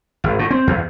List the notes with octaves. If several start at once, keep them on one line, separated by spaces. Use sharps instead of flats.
G#1
A2
C4
E2